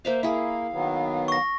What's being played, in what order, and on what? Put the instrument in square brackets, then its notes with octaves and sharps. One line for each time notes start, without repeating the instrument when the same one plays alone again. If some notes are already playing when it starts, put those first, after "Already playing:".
[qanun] A#3 E5 F5 [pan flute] C5
[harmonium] A#3 [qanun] E4 G#4 [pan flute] F5
[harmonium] D#3 F#3 B3
[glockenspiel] C#6 A#6